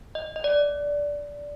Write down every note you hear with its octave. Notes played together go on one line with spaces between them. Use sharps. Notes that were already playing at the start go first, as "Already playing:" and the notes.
D#5
D#5
D5